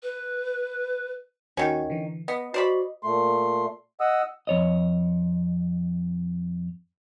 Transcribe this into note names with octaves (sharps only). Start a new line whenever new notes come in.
B4
D#2 D#3 C#4 F#4
D3 E3
B3 D#5
F#4 C5 D5 B5
A#2 A3 C6
D#5 F#5 D#6 E6
F2 C#5 D#5